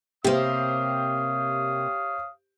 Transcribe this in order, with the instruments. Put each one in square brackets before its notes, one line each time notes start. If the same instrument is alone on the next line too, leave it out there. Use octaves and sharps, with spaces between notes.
[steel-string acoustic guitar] C3 A#3 [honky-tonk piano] G4 C5 [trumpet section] C#5 F5 D#6